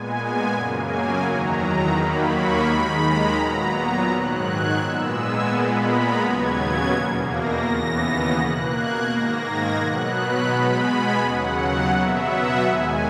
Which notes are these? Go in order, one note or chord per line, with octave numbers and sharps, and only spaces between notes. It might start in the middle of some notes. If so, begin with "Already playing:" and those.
Already playing: A#2 G#3 B3 G#5
F#2 C#3 F#3 A#3
G#5
E2 D#3 F#3 A#5
D#2 D#3 F#3 A#3 B5
C#6
D#2 D#3 G#3 B5
A#5
A#2 F#3 B3 A#5
A#5
G#2 D#3 F#3 F#6
G#6
A#2 G#3 B3 E6
G#5
A#2 G#3 B3 B5
A#5
D#2 C#3 F#3 B3 G#6
E2 B2 A#3
A#6
D#2 C#3 E3 B3
B2 A#3 F#6
G#6
G#2 D#3 A#3 A#6
G#6
B2 F#3 B3 F#6
B5
B2 G#3 B3 B5
G#5
D#2 C#3 F#3 F#5
B2 F#3 B3 E5
F#5
D#2 D#3 G#3 G#5